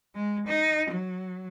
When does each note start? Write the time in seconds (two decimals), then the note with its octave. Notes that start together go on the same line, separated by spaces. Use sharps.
0.15 G#3
0.47 D#4
0.91 F#3